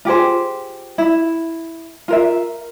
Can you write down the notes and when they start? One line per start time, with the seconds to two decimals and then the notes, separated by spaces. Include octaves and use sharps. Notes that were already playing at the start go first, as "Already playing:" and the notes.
0.05 F4 G4 G#4 C5
0.98 E4
2.08 F4 A#4 E5